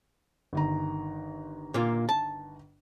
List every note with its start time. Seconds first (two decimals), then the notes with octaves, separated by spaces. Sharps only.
0.53 G1 D#3 A#5
1.74 A#2 A#3 F4
2.09 A5